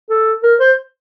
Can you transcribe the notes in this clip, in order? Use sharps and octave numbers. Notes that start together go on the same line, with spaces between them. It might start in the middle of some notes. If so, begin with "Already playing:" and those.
A4
A#4
C5